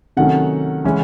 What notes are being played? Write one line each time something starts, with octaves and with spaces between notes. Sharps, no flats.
C3 D#3 F#3 A3 C#4 F#5
C#3 E3 G#3 C#4